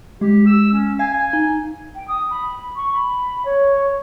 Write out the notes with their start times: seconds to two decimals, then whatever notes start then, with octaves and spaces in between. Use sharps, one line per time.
0.21 G#3 G4
0.46 E6
0.72 C#4
0.99 F5 G#5
1.13 G#5
1.33 D#4
1.95 G5
2.08 D#6
2.30 B5
2.75 C#6
2.92 B5
3.45 C#5